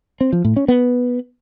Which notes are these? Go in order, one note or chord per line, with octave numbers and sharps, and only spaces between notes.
C4
F3
A2
C#4
B3